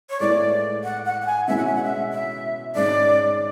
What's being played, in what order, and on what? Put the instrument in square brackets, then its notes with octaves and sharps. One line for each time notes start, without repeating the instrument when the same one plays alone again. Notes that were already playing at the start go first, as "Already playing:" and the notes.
[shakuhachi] C#5
[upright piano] A2 G#3 B3 E4 [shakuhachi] D5
[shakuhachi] F#5
F#5
F#5
G#5
[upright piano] B2 G#3 C#4 E4 [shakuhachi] E5
[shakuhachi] F#5
E5
F#5
E5
E5
[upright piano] G#2 G#3 C#4 [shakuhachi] D5